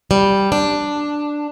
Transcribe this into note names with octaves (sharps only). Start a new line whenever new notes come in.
G3
D4